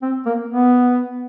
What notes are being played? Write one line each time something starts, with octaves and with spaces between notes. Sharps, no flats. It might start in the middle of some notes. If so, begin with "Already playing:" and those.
C4
A#3
B3